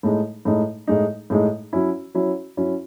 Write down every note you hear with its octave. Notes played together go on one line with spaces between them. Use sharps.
A2 G#3 D#4
A2 G#3 D#4
A2 G#3 D#4
A2 G#3 D#4
F#3 C#4 E4
F#3 C#4 E4
F#3 C#4 E4